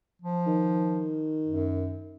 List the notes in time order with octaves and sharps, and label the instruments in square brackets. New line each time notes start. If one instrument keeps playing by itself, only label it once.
[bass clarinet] F3
[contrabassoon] D#3
[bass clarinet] F#2